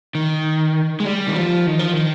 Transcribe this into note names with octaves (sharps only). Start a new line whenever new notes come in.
D#3
G#3
G3
D#3
F3
D#3
F3
D#3